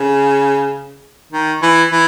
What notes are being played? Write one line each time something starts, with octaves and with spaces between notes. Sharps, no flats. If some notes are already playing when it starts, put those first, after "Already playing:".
Already playing: C#3
D#3
E3
E3